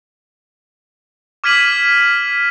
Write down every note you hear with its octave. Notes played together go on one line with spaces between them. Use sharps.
D6 F6 G#6 B6 D#7 F#7